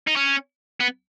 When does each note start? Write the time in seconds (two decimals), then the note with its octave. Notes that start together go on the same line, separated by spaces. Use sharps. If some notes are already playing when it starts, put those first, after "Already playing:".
0.07 D#4
0.16 C#4
0.80 B3